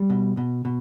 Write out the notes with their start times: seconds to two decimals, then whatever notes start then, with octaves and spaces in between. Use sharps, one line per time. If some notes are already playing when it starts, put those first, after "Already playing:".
Already playing: G3
0.10 B2
0.37 B2
0.65 B2